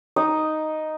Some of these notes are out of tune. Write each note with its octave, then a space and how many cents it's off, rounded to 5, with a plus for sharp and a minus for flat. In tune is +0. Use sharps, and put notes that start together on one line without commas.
D#4 +0 D#5 +0 D#6 -35